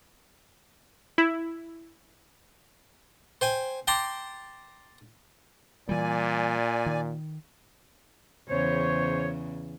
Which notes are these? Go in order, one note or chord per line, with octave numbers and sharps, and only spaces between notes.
E4
C5 G5 G#5
G5 A5 A#5 C6 D6
A#2 E3 G3 D5 G#5
D#3
E2 C#3 C5 C#5